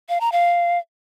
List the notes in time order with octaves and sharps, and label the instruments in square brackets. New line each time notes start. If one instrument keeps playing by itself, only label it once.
[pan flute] F5
A#5
F5